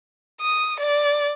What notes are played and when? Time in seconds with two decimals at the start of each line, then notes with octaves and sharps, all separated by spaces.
0.41 D#6
0.80 D5